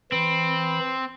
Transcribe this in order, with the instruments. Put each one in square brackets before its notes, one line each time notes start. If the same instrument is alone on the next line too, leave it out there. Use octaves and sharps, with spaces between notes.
[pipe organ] E3 B5 [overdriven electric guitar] C4